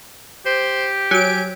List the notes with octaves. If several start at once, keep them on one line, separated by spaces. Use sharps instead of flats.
G4 C5
F#3 G#5 D7